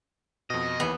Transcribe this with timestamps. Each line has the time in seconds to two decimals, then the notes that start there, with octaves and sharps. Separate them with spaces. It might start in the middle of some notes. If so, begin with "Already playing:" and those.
0.50 F2 B2 D#5
0.80 D#2 E3 B3